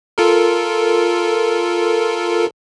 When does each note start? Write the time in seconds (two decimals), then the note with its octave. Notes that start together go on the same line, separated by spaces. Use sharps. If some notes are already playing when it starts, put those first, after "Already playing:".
0.18 F4 A4 A#4